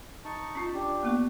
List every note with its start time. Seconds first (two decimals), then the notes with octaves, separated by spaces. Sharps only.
0.25 D#4 A5 C#6
0.55 C#4 F4
0.74 D4 G4
1.03 A#3 B3 C#6